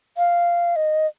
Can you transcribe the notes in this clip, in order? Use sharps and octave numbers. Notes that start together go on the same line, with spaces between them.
F5
D#5